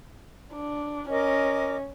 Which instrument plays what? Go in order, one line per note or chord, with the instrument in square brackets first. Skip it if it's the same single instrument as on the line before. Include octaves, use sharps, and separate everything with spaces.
[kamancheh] D4
[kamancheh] C#4 [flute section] A#4 D#5 D6